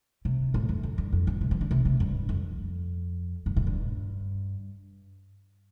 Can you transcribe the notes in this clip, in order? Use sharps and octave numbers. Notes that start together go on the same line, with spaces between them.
C3
A2
F2
F2
G2
F2
G2
C3
F3
D3
C3
C3
G2
F2
G2
A2
G2